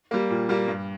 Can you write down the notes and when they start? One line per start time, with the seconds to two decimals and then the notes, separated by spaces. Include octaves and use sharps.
0.11 G3 A#3
0.30 A#2
0.49 G3 A#3
0.68 G2